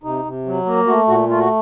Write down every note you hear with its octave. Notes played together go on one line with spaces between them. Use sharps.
C3 D#4
C3
F#3
A#3
A3 F#4
A#2 F#4
A3 F4
F#4